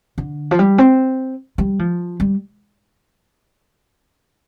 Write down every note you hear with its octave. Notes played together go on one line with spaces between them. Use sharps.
D3
F3
G3
C4
G3
F3
G3